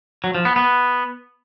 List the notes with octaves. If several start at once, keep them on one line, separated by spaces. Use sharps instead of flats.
F#3
F3
B3
B3